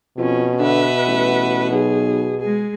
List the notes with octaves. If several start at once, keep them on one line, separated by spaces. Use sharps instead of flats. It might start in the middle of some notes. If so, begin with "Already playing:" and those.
F2 B2 C#4
D3 B4 E5 F#5
A1
B1 G#4
G#3 G#4